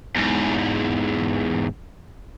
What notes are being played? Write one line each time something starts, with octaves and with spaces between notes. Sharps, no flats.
E2 G#2